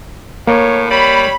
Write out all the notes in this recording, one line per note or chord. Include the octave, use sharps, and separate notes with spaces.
A2 A#3 C#5
G3 C#5 B5